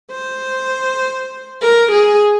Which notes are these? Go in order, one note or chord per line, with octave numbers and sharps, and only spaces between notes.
C5
A#4
G#4